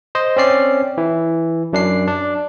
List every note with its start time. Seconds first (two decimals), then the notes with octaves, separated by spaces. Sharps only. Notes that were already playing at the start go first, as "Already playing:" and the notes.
0.15 C5 D#5
0.37 C4 C#4 D5 C7
0.98 E3
1.73 F#2 D4 C7
2.08 D4